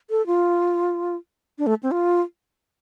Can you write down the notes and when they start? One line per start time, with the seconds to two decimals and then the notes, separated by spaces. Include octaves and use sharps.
0.10 A4
0.27 F4
1.58 D4
1.67 A3
1.83 C4
1.91 F4